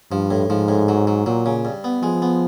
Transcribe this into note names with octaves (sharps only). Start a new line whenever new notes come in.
G2 F3
A2
G#2 F3
A2
F#3
F#3
A#2 F#3
C#3
G2
B3
F3 G#3
B3